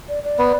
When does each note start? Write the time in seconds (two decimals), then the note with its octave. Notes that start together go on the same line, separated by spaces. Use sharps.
0.09 D5
0.24 D5
0.39 B3